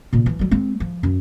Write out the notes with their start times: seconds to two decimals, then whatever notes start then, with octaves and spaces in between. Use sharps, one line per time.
0.13 A#2 C#3
0.26 E3 F3
0.39 F#3 G3
0.51 G#3 C4
0.80 F3
1.03 F#2